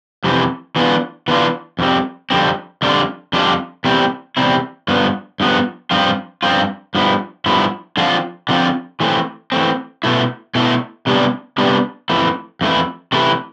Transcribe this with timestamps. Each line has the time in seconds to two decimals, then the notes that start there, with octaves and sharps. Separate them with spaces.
0.24 F2 C3 E3
0.76 E3 B3 D4 F4
1.28 E3 B3 D4 F4
1.79 F2 D3 G3 C4
2.30 F2 D3 G3 C4
2.82 F2 D3 G3 D4 F4
3.33 F2 D3 G3 D4 F4
3.84 E2 C3 G3 C4 E4
4.37 E2 C3 G3 C4 E4
4.88 G2 F3 B3
5.40 G2 F3 B3
5.91 G2 F3 C4 F4
6.43 G2 F3 C4 F4
6.95 G2 F3 B3 E4
7.46 G2 F3 B3 E4
7.97 D3 F3 C4 F4
8.49 D3 F3 C4 F4
9.00 E3 A3 C4
9.52 E3 A3 C4
10.04 B2 A3 E4
10.55 B2 A3 E4
11.07 C3 G3 B3 D4
11.58 C3 G3 B3 D4
12.10 F2 E3 A3 E4
12.61 F2 E3 A3 E4
13.12 C3 E3 A3 E4